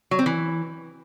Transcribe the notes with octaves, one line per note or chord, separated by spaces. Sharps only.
F#3
C4
E3